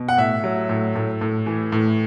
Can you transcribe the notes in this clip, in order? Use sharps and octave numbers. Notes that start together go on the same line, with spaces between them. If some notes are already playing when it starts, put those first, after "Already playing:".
Already playing: B2
F#5
A2 E5
F#3
A2
A2
A2
E3
A2